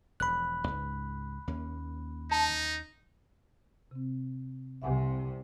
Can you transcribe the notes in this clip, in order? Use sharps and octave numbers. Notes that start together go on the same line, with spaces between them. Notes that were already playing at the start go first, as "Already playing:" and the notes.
E1 F3 B5 F#6
C#2 G#2
D#2 A#3 C#4
D#4 A5
C3 C4
C2 C3 E5 F#5 G#5